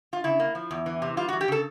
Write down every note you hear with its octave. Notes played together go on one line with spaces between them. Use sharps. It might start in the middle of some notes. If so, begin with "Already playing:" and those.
F4
C#3 E4
A#3
F3
E2
E3
C3
G3 F4
F#4
E3
G4
C#3 A4